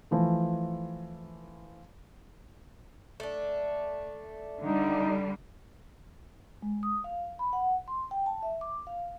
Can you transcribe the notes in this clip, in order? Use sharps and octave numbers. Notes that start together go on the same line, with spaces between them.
E3 F3 A3
A3 D4
D3 G3 D#4
G#3
D#6
F5
B5
F#5
C6
G5
A5
E5
D6
F5